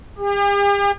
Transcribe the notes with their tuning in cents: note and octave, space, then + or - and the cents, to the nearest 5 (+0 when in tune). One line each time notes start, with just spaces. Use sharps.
G4 +45